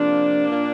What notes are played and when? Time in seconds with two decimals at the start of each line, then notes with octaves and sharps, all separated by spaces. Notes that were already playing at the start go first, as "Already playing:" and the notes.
Already playing: C3 F3 A#3 D4
0.49 A#2 A#3